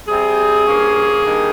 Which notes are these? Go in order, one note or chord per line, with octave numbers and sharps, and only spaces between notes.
C3 G3 C4 G#4
G2 F3 A#3 C#4
G2 D#3 A#3